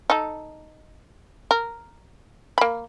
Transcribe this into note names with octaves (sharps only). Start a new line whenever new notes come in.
D#4 A4
A#4
A#3 B5